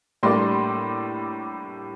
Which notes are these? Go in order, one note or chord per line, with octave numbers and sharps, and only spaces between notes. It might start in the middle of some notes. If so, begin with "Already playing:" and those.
A2 G3 A#3 D4 C6